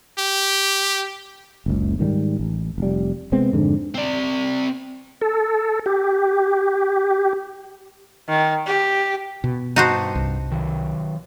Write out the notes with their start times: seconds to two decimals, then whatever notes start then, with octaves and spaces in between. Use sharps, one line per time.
0.19 G4
1.66 F#1 C#2
1.99 G#2 D#3 F#3 G3
2.39 A1
2.78 F1 G3
3.32 C3 G#3 B3 C4
3.52 F2 G#2 D3
3.94 C4 D5
5.21 A4
5.86 G4
8.29 D#3
8.66 G4
9.44 B2
9.76 G2 D#4 F#4 C5 A5
10.15 C2
10.52 D#3 F#3